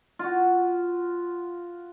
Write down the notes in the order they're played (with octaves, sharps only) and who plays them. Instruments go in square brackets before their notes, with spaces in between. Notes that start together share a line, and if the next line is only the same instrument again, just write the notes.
[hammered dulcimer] F4 F#4